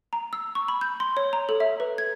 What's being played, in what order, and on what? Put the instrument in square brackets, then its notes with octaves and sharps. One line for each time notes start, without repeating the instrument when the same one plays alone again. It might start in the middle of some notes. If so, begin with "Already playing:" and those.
[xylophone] A#5
E6
C#6
B5
G6
C6
C#5
A#5
A4
E5
B4
G#6